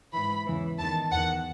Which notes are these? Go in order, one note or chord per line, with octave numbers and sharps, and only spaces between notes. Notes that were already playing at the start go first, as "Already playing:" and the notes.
G#2 E3 B5
E2 C#3 E3
E2 D#3 A5
E2 D#3 F#5